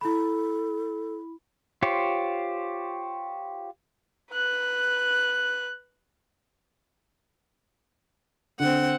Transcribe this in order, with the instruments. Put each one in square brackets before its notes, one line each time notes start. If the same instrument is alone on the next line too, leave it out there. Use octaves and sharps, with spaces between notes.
[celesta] E4 B5 [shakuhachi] A4
[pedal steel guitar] F4 G4 C5 C#5
[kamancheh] B4 F#6
[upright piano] D3 [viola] C4 F#5